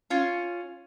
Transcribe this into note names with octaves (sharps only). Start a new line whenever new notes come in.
C#4 F4